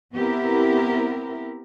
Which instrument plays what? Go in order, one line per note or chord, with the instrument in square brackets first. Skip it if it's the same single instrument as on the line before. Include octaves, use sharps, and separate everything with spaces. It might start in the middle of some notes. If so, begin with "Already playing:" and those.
[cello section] B3 C4 E4 G4 A#4